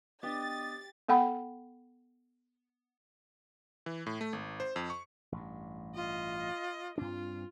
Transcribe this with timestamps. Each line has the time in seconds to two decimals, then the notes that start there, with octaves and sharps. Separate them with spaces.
0.23 B3 D4 G4 D#5 A6
1.09 B3 A4 F#5 G5 B5
3.86 E3
4.06 A2
4.21 A3
4.33 G#1
4.60 C5
4.76 F2
4.90 C#6
5.32 A1 G2
5.95 F4 D#5
6.98 G2 C4 D4 F4